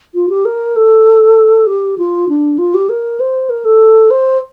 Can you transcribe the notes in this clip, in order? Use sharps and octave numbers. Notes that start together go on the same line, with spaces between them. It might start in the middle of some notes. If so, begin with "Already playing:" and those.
F4
G4
A#4
A4
G4
F4
D4
F4
G4
A#4
C5
A#4
A4
C5